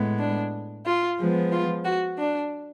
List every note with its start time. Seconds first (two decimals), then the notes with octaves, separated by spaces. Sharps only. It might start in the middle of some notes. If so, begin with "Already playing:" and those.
Already playing: A2 G#3 B3
0.19 D4
0.85 F4
1.19 F3 G#3 B3
1.52 F4
1.84 F#4
2.18 D4